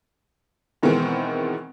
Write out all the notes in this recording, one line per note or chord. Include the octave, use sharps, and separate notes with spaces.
B2 D#3 E3 G#3 B3 C4